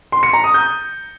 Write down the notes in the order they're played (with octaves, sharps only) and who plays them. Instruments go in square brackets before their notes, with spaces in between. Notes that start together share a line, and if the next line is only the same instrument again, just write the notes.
[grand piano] C6
C#7
A#5
D#6
G6